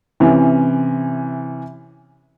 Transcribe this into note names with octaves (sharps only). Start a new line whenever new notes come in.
C3 E3 C#4